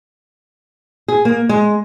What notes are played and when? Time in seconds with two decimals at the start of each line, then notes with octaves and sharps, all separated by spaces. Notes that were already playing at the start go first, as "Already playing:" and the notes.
1.08 G#4
1.25 A#3
1.49 G#3